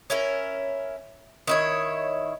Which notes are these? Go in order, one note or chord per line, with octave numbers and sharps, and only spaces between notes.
C#4 E4 A#4
D#3 E4 C#5